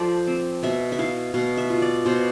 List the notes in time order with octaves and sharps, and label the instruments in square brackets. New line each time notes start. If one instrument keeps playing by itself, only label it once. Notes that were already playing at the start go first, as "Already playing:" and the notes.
Already playing: [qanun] F3 F4 A4 C5 D5
C4
B2 E5
E5
E4 F5
B2 F5
E5
F4
D5
B2 C5